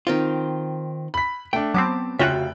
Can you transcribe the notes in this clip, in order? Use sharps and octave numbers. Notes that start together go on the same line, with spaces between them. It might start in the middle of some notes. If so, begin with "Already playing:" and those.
D#3 C4 F4
B5 B6
A3 D4 G5
F#3 B3 C4 A5 D6
F1 C#3 F4 F#4 E5 G5 F#6